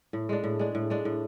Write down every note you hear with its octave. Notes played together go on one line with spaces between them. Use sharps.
A2
G#3 D4
A2
G#3 D4
A2
G#3 D4
A2